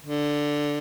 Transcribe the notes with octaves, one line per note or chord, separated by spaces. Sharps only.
D3